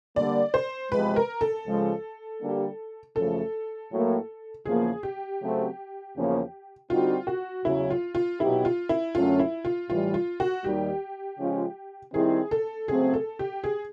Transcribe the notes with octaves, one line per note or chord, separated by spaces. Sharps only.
D3 G3 A#3 D5
C5
E2 C3 F3 G#3 B4
A#4
A4
C#2 C#3 F3 G#3
D3 G3 A#3 D4 G4
F#2 C#3 F3 A3 A4
A2 F#3 A#3
E2 C#3 F3 A#3 G#4
G4
C#3 F#3 A3 C4
E2 C#3 F3 A#3 C#4
D3 G3 C4 D#4 F4 F#4
F#4
E2 C#3 F#3 E4
F4
F4
B2 F#3 B3 D#4 E4 G4
F4
E4
F#2 D3 F#3 A3 C#4 F4
E4
F4
A2 E3 G3 F4
F4
F#4
D#2 D#3 G3 G4
C#3 F3 G#3 C#4 F4
D#3 G3 C4 E4 G#4
A4
C#3 F#3 A3 C4 G#4
A4
G4
G#4